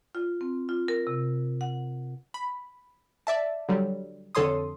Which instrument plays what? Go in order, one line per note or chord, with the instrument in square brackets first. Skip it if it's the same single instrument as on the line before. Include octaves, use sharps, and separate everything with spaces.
[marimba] F4
C4
F4
A#4
C3
F#5
[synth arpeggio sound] B5
D5 E5 A5
D3 F#3 G3
F2 D3 A4 C#5 C6 D#6